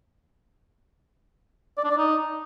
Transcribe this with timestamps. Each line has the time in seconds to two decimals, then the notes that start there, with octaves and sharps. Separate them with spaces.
1.78 D5
1.84 D4
1.91 D5
1.97 D#4